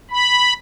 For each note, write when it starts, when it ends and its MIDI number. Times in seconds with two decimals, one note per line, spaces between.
0.11 0.53 83